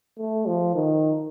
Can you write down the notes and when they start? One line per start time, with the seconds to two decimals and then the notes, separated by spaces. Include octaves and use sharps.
0.19 A3
0.47 F3
0.75 D#3